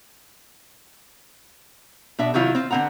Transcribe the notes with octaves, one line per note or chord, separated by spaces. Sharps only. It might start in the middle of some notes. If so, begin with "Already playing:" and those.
B2 D4 E5
C3 D#3 F#3 E4 F4
C4 F4
D3 B3 C4 F#5 A#5